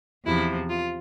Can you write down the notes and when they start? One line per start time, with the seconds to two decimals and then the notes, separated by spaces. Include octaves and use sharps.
0.25 E2 C3 F3 E4
0.69 F4